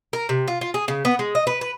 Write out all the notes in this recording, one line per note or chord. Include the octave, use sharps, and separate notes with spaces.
A#4
C3
F4
F4
G#4
C#3
B3
G#3
D#5
B4
B4